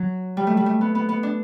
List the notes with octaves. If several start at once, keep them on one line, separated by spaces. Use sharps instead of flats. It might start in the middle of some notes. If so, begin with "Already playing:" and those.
Already playing: F#3
G3
A3
G3
A3
B3
B3
B3
D4